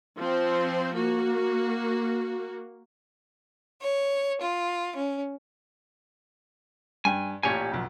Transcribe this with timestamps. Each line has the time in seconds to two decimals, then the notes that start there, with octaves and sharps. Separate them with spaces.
0.18 F3 C4 C5
0.95 A#3 F#4
3.80 C#5
4.40 F4
4.95 C#4
7.05 G2 G5 G#5
7.43 A1 A#2 G4 C#5 G#5
7.72 B1 F2